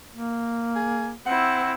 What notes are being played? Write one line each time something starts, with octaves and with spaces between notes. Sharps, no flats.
A#3
G#4
C4 E4 F#5